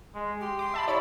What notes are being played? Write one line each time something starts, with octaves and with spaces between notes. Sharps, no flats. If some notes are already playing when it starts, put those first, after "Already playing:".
G#3
G4 C6
C6 D6
E5 A5 B5
E4 C#5 D5